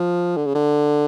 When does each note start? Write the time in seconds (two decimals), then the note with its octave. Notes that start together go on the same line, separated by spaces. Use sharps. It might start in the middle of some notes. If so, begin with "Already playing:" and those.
Already playing: F3
0.37 D3
0.46 C#3
0.55 D3